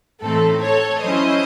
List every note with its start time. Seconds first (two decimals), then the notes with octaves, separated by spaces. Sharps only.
0.22 A2 E3 A3 C4 D#4 A4
0.62 A4 C#5
1.02 F#3 C#4 E4 C5 D#5